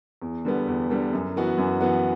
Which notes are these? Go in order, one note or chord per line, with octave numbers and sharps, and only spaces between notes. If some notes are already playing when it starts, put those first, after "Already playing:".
E2
D3 G3 B3
E2
D3 G3 B3
F#2
E3 B3 F#4
F#2
E3 B3 F#4